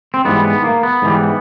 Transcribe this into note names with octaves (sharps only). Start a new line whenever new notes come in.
C4
G#2 E3 G3 B3
B3
A#3
B3
G#2 E3 G3